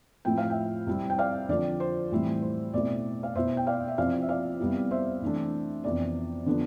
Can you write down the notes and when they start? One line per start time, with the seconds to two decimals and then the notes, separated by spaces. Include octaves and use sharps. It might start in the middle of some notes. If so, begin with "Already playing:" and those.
0.25 A2 F3 C4 E4 G5
0.38 F5
0.50 E5 G5
0.87 C3 G3 C4 E4
1.10 G5
1.18 D5 F5
1.49 D3 F3 C4 D5
1.80 C5
2.11 A2 E3 G3 C4 E4
2.42 C5
2.74 B2 A3 C4 E4 D5
3.23 F5
3.35 B2 B3 E4 C5 E5
3.57 G5
3.67 D5 F5
3.88 E5
3.97 C3 F3 C4 E4 D5 F5
4.22 E5
4.29 D5 F5
4.60 C3 G3 B3 E4
4.91 C5 E5
5.22 C3 E3 A3 D4
5.84 F2 C3 E3 B3 D5
6.46 D3 F3 B3 D4